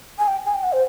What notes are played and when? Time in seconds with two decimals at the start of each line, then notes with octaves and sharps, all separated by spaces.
0.19 G#5
0.28 G5
0.46 G#5
0.54 G5
0.63 F#5
0.73 C5